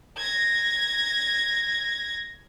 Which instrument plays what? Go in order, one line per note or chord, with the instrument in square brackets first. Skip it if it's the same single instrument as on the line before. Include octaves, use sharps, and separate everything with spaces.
[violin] G#6 A#6